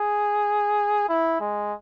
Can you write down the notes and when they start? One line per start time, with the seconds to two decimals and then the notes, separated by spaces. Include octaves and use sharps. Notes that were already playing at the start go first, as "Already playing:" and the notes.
Already playing: G#4
1.09 E4
1.40 G#3